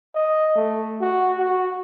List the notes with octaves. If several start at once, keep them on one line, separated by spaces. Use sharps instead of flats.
D#5
A3
F#4
F#4